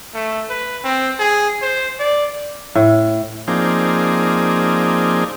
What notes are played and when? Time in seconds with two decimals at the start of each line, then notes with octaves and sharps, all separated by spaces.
0.14 A3
0.49 B4
0.84 C4
1.19 G#4
1.62 C5
1.99 D5
2.75 A2
3.48 F3 A#3 C4 D#4 G#4 D5